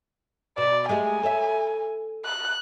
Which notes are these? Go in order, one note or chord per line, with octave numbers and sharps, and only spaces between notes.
B2 D5
G#3 A3 G4 G#5
A4 C#5 E5
F#6